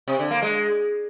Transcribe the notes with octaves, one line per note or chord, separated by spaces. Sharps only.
C3
D3
A#3
G#3